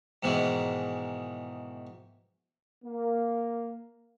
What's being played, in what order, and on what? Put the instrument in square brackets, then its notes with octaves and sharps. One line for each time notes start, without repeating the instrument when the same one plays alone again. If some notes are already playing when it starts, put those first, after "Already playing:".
[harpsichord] G#2 B2 D#3 E3 G#3
[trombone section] A#3